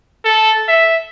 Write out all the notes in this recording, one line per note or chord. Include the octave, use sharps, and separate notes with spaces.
A4
E5